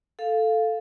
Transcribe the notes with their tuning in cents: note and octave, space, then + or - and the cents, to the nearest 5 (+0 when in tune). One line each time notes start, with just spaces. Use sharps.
A4 +0 F5 +0